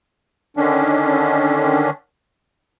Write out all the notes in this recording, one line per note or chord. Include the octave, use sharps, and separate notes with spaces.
D3 D#3 C#4 D4